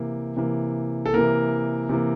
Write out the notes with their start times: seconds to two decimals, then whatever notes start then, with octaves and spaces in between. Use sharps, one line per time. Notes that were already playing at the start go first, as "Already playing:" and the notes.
Already playing: C3 E3 A#3
0.37 C3 E3 A#3
1.06 A4
1.13 C3 E3 A#3 A#4
1.89 C3 E3 A#3